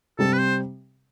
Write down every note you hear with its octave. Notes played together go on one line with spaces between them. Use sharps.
C3 G3 C4 G4 A4
B4
C5